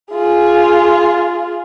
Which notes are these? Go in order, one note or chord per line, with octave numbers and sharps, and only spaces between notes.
F4 G#4